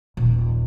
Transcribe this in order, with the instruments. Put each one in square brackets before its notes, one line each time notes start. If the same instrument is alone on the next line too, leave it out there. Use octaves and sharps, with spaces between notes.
[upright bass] D#1